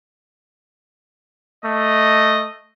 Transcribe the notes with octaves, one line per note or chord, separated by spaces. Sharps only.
A3 D#5